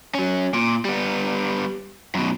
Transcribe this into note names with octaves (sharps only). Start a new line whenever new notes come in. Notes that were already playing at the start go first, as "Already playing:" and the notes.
F#3 C#4
A#2
G3 B3
F#2 B2